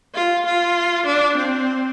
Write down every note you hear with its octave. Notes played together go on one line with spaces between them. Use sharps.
F4
F4
D4
C4